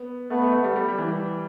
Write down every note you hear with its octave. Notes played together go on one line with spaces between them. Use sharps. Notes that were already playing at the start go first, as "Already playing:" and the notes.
Already playing: B3
A3 B3
A3
A3
G3
G3
G3
E3